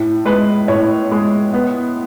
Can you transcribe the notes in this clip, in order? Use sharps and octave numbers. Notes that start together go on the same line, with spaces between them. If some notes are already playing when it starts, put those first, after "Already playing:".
Already playing: A2
G#3 B4
A2 C#5
G#3
B3